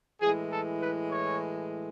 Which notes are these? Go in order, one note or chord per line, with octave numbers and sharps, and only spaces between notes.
A2 E3 G#3 G#4
A4
B4
C#5